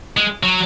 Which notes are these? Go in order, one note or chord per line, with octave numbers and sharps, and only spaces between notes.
G#3
F#3